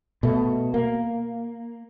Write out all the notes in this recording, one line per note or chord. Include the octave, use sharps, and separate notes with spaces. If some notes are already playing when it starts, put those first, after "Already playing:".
B2 A3
A#3